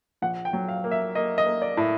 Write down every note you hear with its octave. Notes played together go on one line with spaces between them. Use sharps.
A#1 F#5
G5
F#3
F5
A#3
E5
A#3 D#5
D#5
A#3
D5
A2